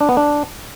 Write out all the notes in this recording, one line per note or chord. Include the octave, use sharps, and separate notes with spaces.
D4
B3
D4